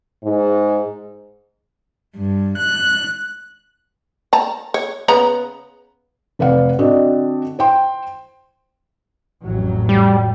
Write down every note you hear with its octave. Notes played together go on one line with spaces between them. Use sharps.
G#2
G2
F#6
A5 A#5
C#5
C#3 B3 A#5
F1 B4 D5 F5 F#5
D3 C4 F#4 D5 D#5
C5 G5 C6
A1 F2 F#3
G3